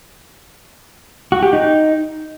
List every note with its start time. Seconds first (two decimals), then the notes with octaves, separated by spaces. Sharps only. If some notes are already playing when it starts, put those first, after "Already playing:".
1.32 F#4
1.42 G4
1.53 D#4